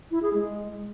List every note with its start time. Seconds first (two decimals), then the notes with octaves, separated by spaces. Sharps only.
0.11 E4
0.22 G#4
0.34 G#3